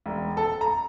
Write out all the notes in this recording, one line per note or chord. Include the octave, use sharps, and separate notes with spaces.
E1
A4
A#5